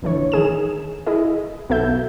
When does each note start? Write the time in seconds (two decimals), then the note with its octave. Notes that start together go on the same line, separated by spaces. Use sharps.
0.02 A#1 D3 E3 C#5
0.32 D#3 G#4 E7
1.06 E4 G#4 D#5
1.70 B1 B3 F#4 A4 E5 G6